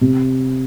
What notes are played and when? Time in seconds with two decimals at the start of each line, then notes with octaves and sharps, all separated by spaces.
0.01 C3